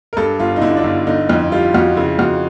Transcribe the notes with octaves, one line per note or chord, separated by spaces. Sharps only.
A#4
G2 A4
G1 F4
D#4
D3 E4
D4
G1
D3 D#4
F2 E4
G3 F4
F2 F#4
C#3 E4
F2 F#4